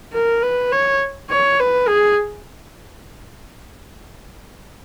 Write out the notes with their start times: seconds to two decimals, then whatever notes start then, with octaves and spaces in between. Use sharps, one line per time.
0.13 A#4
0.43 B4
0.72 C#5
1.30 C#5
1.60 B4
1.88 G#4